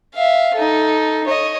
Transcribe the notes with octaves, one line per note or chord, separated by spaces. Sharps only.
E5 F5
D#4 A4
C#5 D#5